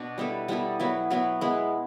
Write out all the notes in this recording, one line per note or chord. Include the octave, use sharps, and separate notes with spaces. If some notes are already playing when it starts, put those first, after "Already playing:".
Already playing: B2 D4
G3 B3 E4 A4
G3 B3 E4 A4
F#3 B3 E4
F#3 B3 E4
G#3 B3 E4